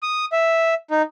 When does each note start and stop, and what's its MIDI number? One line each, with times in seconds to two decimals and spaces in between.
0.03 0.25 87
0.32 0.74 76
0.91 1.02 63